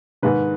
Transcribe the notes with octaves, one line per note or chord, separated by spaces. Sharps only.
G#2 D#3 B4